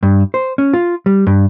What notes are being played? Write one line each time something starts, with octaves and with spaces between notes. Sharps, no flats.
G2
C5
C#4
F4
G3
G2